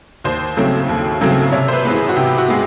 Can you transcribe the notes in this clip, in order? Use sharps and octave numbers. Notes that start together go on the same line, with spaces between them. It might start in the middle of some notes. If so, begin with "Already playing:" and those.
D#2 C5
C#3 F#3 A3 C4
D#2
C#3 F#3 A3 C4
C3 C#5
C5
B4
E3 G#3 B3
G#4
F#4
C3 G4
F#4
G#3 B3